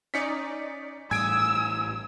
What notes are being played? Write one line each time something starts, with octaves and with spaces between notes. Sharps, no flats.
C#4 D#4 D5 B6 C#7
A1 A2 G3 G#5 D#6 E6 G#6 D7